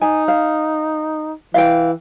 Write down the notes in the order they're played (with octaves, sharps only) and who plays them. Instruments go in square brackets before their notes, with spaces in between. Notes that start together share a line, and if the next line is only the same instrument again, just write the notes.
[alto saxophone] D#4 [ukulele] G#5
[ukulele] F5
[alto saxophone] E3 [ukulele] F5 G5